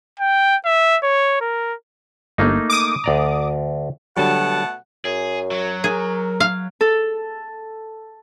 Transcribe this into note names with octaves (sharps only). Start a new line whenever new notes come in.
G5
E5
C#5
A#4
G1 A3 A#3 D#4
D6 D#6
D2 D5 A#5
B2 D3 F#3 G3 A3 F#5 A5
F#2 G#4
F#3
G#4 A#4
F5
A4